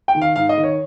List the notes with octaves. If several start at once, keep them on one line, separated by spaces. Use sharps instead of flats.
G5
D#3
F5
G#2 F5
D#5
D#3
C#5